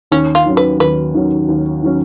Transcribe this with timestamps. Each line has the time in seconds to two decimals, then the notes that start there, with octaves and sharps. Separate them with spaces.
0.12 D#2 C#4
0.35 F4
0.46 D#3 F#3 C#4
0.57 B4
0.80 D#2 B4
1.14 D#3 F#3 C#4
1.49 D#2
1.83 D#3 F#3 C#4